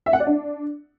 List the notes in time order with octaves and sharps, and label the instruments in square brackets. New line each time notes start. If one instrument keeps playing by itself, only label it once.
[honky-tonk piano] E5
F#5
D5
D4